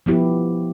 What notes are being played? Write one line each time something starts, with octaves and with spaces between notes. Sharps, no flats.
F3 B3 E4 G4